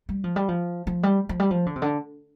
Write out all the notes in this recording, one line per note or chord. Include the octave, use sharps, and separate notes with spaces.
G3
F3
G3
F3
F3
G3
F3
G3
F3
D3
C3
D3